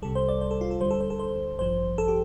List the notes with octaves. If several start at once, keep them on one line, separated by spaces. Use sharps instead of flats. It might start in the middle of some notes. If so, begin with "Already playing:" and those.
C2 C3 G3 A4
C5
D5
C5
A4
F4
A4
D2 D3 G3 C5
A4
C5
A4
C5
A1 G2 F3 C5
A4
G4